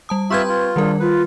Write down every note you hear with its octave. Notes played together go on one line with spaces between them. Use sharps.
G3 A5 D#6
C4 F4 G4 B4 E5 C#6 G6 G#6
F4
D#3 G3 D4 A#4
F4 B4